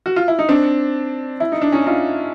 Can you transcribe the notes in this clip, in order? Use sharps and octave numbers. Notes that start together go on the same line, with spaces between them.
F#4
F4
E4
D#4
C4 D4
E4
D#4
D4
C#4 D#4
D#4 F4